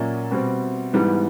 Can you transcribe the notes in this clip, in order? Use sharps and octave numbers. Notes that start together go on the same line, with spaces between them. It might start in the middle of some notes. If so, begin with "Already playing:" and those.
Already playing: A#2 F#3 A#3 C#4 D5 E5
B2 G3 C4
G#2 E3 G3 B3